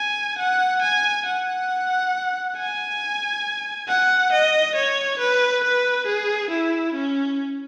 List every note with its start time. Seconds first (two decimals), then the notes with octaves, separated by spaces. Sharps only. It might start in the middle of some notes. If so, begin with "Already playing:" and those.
Already playing: G#5
0.38 F#5
0.82 G#5
1.26 F#5
2.57 G#5
3.88 F#5
4.32 D#5
4.75 C#5
5.19 B4
5.63 B4
6.07 G#4
6.50 E4
6.94 C#4